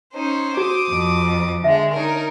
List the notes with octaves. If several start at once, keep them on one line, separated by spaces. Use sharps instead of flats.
C#4 D#4 C5
F#4 D6 D#6
F2
D3 G#3 E5
D#4 A#4 C#5